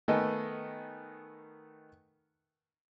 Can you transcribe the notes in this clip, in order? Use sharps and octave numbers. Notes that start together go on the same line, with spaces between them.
D#3 A3 B3 D#5 G#5